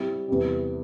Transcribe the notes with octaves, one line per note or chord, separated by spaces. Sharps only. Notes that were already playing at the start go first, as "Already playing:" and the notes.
Already playing: G3 C4 E4
E2 C3 G3